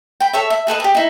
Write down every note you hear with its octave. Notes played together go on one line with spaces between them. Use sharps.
G5 B5
A4 C#5 E5
E5
G#4 A4 B4 D#5
G4 G#4
D#4 E4